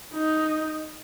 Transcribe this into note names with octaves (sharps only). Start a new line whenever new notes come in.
D#4